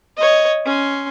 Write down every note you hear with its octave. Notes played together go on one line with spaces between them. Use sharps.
C#5 D#5
C#4 C6